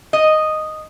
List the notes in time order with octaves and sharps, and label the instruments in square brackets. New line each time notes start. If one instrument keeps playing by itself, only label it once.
[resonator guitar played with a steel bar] D#5